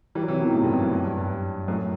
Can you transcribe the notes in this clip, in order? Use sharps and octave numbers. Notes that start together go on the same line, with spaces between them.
E3 G3
F#3
C3 E3
B2 D#3
A2 C3
G2 B2
F#2 A2
G2
F#2
G2
G2
F#2 A2